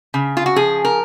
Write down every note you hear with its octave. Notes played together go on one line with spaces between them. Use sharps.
C#3
F4
F#4
F3 G#4
A#4